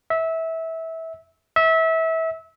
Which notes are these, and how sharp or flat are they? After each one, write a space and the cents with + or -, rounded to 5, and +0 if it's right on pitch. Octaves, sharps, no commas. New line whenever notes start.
E5 -20
E5 -25